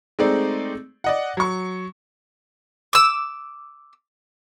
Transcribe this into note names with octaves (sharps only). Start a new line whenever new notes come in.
G#3 A3 C4 D#4 D5
D5 D#5 F#5
F#3 C#6
D6 E6